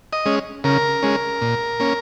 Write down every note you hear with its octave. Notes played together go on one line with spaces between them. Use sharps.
D#5
G#3 C#4
C#3 A#4
G#3 C#4
A#2
A#3 C#4